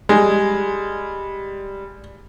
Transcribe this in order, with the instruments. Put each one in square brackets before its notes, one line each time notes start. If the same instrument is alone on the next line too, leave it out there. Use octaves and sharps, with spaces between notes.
[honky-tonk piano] G3 [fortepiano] G#3